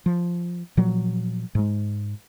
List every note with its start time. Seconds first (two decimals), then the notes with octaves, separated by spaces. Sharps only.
0.06 F3
0.77 A#2 F3 F#3
1.55 G#2 G#3